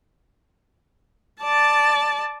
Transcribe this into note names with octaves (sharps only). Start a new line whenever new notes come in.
D5 A5